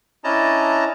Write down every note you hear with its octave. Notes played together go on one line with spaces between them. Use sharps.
C#4 D4 E4 D#5 A5 A#5